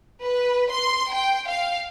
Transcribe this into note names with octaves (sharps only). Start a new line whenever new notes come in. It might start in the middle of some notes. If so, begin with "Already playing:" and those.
B4
C6
G5
F5